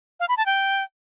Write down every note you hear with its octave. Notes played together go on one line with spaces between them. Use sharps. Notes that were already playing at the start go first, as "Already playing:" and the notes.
F5
B5
A5
G5